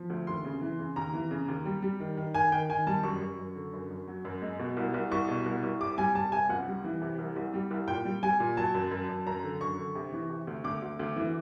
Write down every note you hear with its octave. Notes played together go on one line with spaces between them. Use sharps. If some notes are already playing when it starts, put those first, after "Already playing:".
Already playing: F3
D2
D#2 C6
C#3
E3
C#3
D#2 A#5
E3
C#3
D#2
G3
G3
D#3
D#3
D#3 G#5
D#3 G5
D#3 G#5
G3 A5
F#2 C#6
F#2
F#2
D3
F#2
F#2
F#3
F#2
G#3
B2
C2
C2
C2 C#6
B2
C2
C2
C3 D6
G3 G#5
G3 A5
C3 G#5
C#2 F#5
G3
E3
C3
C2
C2
G3
C2
A#2 G5
G3
G3 G#5
A#2
F#3 A5
F#2
F#2
F#2
F#2 A#5
D3
F#2 C#6
D3
C3
E3
C3
D2
D2 D6
D2
D2
E3